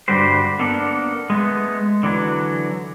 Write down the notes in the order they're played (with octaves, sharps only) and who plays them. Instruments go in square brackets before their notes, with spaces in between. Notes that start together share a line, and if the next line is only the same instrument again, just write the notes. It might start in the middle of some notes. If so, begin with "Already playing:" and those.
[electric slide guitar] G2 D3 G3 F#4 G4 C5
A#3 B3 D4 A4
G#3 A3 B3
D3 E3 F#3